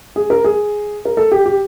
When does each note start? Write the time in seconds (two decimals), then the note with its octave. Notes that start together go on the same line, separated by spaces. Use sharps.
0.16 G#4
0.30 A#4
0.44 G#4
1.05 A#4
1.17 A4
1.32 G4
1.46 G4